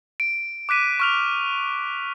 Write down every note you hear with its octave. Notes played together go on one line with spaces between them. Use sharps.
D7
D6 F#6 B6 D#7
C#6 F6 F7